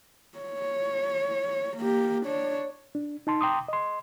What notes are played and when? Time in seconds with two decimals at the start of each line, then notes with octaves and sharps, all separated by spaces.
0.38 C#5
1.77 A#3 G4
2.26 D4 C#5
2.95 D4
3.27 D#4 A5 C6
3.41 G5 A#5 C6 D6 D#6
3.68 D#5 C6